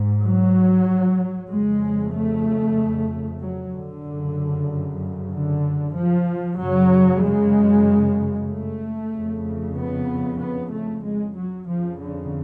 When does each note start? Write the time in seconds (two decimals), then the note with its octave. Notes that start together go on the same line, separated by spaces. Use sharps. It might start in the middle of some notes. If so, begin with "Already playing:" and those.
Already playing: G#2
0.22 F#3
1.49 F2 C#3 G#3
2.13 A3
3.40 F#3
3.72 D3
4.04 F#2 C#3
5.32 D3
5.95 F3
6.58 F#2 C#3 F#3
7.22 G#3
8.49 A3
9.13 F2 C#3
9.76 B3
10.40 B3
10.72 A3
11.03 G#3
11.36 F#3
11.67 F2 C#3 F3
11.98 D3